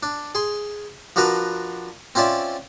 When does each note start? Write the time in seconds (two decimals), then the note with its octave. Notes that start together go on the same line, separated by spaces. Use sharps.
0.03 D4
0.35 G#4 C6
1.16 F3 D4 F#4 A#4 B4
2.15 C4 C#4 F4 D5 E5